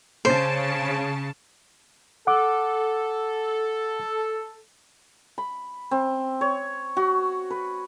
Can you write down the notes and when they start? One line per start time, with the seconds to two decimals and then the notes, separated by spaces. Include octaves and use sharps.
0.25 C#3 C5 A5
2.27 A4 F#5 D6
5.38 B5
5.91 C4
6.41 C#5
6.97 F#4
7.51 B4